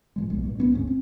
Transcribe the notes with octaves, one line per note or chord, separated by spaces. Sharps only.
A2 F3 G#3
D#1 B1 A#2 G#3
G2 A#2 A#3
C#2 F#2 B3 D4
F1 D2 G#2 C#4
C4